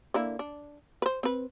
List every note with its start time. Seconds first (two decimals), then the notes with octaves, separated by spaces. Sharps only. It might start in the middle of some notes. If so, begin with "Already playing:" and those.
0.14 D3 A#3 E4
0.39 D4
1.02 B4 C5
1.23 C4 B4